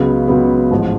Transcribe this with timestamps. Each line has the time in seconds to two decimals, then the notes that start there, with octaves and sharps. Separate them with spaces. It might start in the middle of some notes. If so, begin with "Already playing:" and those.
Already playing: C#2 C#3 F#3 B3
0.28 C#2 C#3 F#3 B3
0.71 A1 G#2 F3